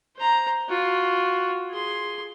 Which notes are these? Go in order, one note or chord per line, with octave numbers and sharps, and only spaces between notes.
C5 A#5
F4 F#4
G#4 C6